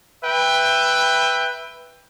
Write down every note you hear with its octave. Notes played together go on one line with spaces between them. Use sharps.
B4 E5 G5